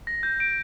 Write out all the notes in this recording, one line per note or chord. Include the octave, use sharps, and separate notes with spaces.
A#6
G6
D7